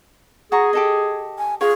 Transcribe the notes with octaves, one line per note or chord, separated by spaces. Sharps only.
F#4 G#4 A#5 C#6
G4 A4 D#5
G#5
F4 G#4 C#5